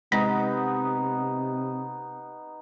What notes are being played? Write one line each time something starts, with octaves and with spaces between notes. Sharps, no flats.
C3 G#3 B3 D#4 A#6